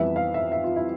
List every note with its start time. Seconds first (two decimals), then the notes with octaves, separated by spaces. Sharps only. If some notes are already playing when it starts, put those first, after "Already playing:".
Already playing: F2 E3 G3 B3 E5
0.16 F5
0.34 E5
0.52 E5
0.64 F4
0.76 E4